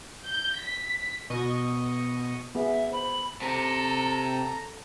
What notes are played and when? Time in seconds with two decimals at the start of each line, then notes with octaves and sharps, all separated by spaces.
0.25 G6
0.59 B6
1.30 B2 D#5 C#6
2.55 B3 G#4 E5
2.92 C5 B5
3.42 C3 A4 A#5